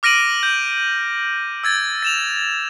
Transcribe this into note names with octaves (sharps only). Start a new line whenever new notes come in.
D6 F6 A#6 D7 D#7 F#7
G6
E6 G#6 A6
A6 E7 F7